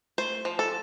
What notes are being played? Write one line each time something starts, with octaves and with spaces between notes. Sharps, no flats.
A3 C5
F3
A4